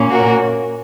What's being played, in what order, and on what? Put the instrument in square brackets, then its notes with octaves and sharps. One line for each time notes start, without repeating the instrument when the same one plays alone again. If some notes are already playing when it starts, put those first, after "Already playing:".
Already playing: [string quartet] A#2 A#3 C#4
F#4 A#4